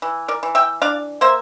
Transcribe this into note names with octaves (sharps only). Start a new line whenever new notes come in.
E3
A#4 D5
E3
E5 G5
D4 D5 F5
A#3 C5 E5